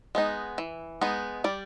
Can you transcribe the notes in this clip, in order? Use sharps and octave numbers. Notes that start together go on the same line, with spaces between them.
G#3 B3 D#4
E3
G#3 B3 D#4
G3 D5